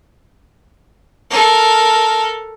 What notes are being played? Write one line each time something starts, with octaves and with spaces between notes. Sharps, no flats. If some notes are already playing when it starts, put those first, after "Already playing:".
A4 A#4